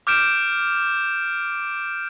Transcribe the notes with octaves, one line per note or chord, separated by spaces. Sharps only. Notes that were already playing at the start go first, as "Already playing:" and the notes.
D6 F6 G6 D7 E7